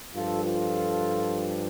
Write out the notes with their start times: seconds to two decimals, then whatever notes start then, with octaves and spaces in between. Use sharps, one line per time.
0.15 G2 F3 F4 A4
0.44 F4 A4